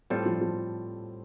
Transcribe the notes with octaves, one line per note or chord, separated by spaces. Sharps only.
A2 G3 C4 F4 A4
F3
F3